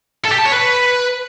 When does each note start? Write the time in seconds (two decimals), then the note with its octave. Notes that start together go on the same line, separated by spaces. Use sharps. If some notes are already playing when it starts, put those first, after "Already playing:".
0.25 A4
0.32 G4
0.38 A5
0.45 C#5
0.52 B4